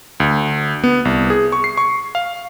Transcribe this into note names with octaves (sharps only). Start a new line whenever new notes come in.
D2
B3
C2
G#4
C#6
C7
C#6
F5